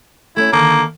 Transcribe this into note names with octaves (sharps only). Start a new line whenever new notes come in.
A3 C#4 E4
D3 D#3 A#3